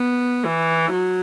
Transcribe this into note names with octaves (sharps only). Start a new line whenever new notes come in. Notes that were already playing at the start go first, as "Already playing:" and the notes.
Already playing: B3
E3
F#3